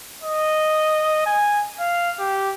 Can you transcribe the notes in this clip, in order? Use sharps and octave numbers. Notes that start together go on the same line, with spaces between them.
D#5
G#5
F5
G4